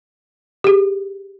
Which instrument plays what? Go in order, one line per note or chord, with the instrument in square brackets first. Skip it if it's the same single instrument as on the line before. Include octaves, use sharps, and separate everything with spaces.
[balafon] G4 G#4